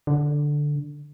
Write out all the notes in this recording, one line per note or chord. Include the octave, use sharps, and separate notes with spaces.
D3